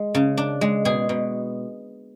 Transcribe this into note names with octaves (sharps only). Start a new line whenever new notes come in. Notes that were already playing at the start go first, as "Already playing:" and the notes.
Already playing: G#3
C#3
D4
G#3
B2 G#4
B2